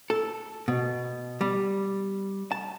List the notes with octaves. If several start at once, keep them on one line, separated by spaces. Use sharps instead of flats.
A4
B2
G3
A5